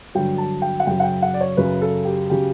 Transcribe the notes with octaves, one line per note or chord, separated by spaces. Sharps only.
G2 D3 F#3 G5
A5
G5
F#5
F#2 C#3 F#3 G5
F#5
G5
F#5
D5
C#5
F#2 C#3 F#3 B4
A4
G4
C#3 F#3 G4